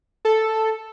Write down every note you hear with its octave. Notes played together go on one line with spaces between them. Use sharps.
A4